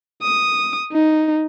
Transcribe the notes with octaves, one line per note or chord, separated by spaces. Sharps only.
D#6
D#4